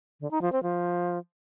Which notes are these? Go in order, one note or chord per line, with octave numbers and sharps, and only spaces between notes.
D3
D#4
F3
C4
F3